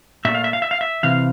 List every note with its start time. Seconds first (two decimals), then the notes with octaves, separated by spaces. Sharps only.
0.25 A#2 A3 E5
0.35 F5
0.44 E5
0.53 F5
0.62 E5
0.71 F5
0.81 E5
1.03 C3 E3 F5